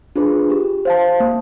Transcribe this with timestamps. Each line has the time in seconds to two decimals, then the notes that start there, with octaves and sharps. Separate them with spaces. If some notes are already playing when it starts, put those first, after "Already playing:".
0.16 D4 F4 G#4 B4
0.50 G4
0.85 C5 F5 A5
1.20 A#3